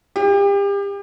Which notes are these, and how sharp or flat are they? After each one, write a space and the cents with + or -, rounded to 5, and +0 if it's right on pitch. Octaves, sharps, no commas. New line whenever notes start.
G4 +35